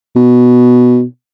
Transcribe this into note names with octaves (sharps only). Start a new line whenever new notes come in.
B2